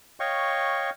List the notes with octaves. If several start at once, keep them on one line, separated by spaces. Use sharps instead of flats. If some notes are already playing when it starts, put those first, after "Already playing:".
C#5 D#5 F5 G5 C#6